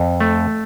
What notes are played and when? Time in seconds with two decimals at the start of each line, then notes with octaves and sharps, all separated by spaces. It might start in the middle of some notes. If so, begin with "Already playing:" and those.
Already playing: F2
0.20 A3